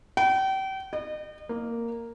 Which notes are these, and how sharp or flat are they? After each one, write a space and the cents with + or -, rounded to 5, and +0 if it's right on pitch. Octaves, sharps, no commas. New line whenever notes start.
G5 -35
D#5 -40
A#3 -5